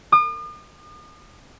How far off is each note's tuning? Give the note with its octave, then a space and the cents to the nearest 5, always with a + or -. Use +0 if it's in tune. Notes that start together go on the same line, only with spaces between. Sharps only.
D#6 -45